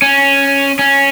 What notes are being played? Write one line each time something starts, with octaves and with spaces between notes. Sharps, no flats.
C#4
C#4